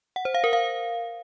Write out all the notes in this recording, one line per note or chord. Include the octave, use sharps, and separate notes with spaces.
F#5
C5
F5
A#4
F5